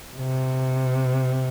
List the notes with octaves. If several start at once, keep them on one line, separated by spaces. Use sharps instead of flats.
C3